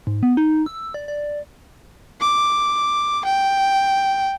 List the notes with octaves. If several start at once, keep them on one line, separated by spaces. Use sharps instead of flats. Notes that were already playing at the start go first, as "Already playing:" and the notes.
G#2
B3
D#4
E6
D5
D5
D6
G5